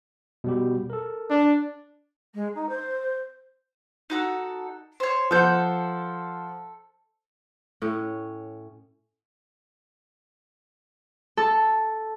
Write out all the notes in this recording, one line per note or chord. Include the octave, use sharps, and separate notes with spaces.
B2 G3 G4
A4 A#4
D4
G#3
D#4
C5
D#4 F#4 A4
C5 C#5
F3 A4 C5 F#5 G6
A2 C#4
A4